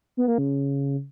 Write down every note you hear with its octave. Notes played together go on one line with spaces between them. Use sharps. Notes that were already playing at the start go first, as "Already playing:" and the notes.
B3
A#3
C#3